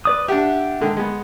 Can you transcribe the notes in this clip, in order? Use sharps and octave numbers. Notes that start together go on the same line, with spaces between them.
B4 D5 D#6
D4 G4 E5 F#5
G#2 D3 D#3
G#3 B3